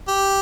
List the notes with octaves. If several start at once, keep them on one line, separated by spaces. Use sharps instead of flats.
G4